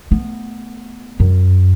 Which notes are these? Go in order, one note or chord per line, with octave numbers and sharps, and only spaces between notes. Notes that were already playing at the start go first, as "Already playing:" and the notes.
A3 B3
F#2